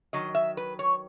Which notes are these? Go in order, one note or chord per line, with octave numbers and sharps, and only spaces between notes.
D#3 F#3 D#5
E5
B4
C#5